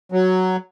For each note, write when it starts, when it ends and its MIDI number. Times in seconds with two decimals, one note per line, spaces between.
0.12 0.56 54